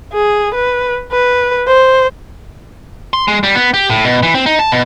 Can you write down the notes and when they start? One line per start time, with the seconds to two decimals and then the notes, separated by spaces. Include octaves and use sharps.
0.13 G#4
0.54 B4
1.12 B4
1.67 C5
3.13 C6
3.28 G#3
3.43 G3
3.55 B3
3.74 G4
3.89 A2
4.05 B2
4.23 E3
4.35 C4
4.46 D#4
4.59 A5
4.72 B2